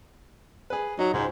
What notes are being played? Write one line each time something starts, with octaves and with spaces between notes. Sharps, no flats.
G#4 B4
F#3 D#4
C#2 G#2 C5